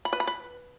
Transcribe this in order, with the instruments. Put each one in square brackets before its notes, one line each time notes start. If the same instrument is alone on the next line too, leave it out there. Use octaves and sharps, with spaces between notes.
[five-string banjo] B5
B4
B5
B4